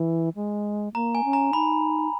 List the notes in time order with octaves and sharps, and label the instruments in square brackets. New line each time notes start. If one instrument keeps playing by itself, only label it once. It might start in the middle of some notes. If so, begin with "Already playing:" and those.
Already playing: [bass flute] E3
G#3
[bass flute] A#3 [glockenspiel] A#5
[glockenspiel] G#5
[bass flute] C#4
[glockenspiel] A#5
[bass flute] D#4 [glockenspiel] B5